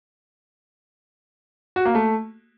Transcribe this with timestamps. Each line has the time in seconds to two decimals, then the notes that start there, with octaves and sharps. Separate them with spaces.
1.76 F#4
1.85 A#3
1.95 A3